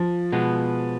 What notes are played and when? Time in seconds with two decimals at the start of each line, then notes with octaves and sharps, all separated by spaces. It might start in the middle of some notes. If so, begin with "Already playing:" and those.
Already playing: F3
0.32 B2 G#3 B3